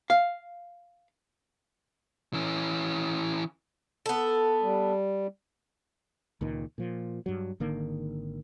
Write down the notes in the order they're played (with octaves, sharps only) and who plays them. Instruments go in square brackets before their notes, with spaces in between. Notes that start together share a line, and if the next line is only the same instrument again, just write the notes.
[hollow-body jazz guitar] F5
[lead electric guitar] E3 C#4
[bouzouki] B3 A4
[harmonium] G3
[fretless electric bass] C#2 A#2 D#3
A#2 F3
G2 F#3
G#1 D3 D#3 A#3